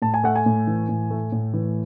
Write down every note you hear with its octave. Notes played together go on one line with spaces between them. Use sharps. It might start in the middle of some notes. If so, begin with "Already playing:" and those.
A2 A5
G#5
A3 F#5
G#5
A2
E3
A2
A3
A2
E3